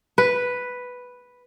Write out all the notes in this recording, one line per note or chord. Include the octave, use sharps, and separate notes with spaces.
B4